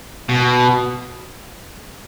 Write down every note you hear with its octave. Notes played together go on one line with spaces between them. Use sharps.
B2